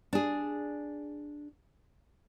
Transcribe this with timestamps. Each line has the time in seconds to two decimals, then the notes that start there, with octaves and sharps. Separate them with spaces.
0.13 D4 G#4